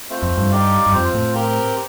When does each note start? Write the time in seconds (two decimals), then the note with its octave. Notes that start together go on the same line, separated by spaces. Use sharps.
0.10 A3 C4 F4 C5
0.22 F2
0.38 G2
0.51 D#4 G4 D5 F5
0.86 G2
0.92 F2 C4 F4 C5
1.14 A2
1.35 C4 G4 A#4